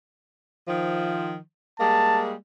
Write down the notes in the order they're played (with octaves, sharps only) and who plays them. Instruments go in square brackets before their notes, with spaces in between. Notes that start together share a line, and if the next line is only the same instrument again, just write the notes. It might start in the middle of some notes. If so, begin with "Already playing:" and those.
[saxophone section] D#3 F3
[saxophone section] G3 G#3 A#3 [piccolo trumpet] A5